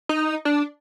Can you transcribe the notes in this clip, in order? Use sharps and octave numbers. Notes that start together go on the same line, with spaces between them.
D#4
D4